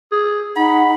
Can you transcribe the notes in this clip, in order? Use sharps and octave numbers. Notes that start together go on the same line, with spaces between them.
G#4
D#4 F#5 B5